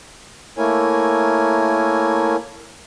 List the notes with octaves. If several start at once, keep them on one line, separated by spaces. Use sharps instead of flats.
A3 A#3 E4 A#4 C#5 G#5